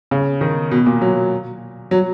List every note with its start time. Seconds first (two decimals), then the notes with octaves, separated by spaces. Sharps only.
0.11 C#3
0.41 D#3
0.71 B2
0.86 A#2
1.01 F#3
1.91 F#3